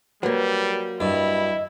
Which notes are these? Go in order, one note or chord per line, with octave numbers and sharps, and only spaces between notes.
F#3 G3 A#3 B4
G2 E4 D#5